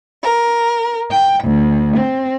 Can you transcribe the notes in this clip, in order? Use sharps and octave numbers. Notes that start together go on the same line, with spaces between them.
A#4
G5
D2
C4